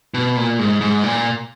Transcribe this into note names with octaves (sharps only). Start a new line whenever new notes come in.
B2
A#2
G#2
G#2
A#2